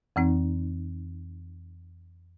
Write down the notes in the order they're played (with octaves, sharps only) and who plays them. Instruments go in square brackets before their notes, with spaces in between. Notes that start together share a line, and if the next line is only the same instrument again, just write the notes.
[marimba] F2 E3 C4 D#4